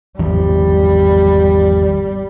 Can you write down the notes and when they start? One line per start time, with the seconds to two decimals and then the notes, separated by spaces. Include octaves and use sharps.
0.19 G#1 E2 F3 G3